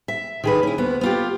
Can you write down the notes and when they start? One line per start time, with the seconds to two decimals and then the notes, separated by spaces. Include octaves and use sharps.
0.08 E5
0.44 D#3 G#4 B4
0.63 C#4 E4
0.78 D2 B3
1.01 B3 F4 G4